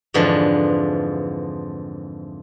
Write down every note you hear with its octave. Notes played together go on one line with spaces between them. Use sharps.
F2 G#2 D3 E3 F3